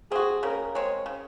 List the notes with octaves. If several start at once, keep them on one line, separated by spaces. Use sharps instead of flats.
C4 F#4 G#4
C#3 A#4
G#3 C4 C#5
C#3